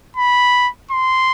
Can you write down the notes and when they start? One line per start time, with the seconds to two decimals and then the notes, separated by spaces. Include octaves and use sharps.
0.16 B5
0.91 C6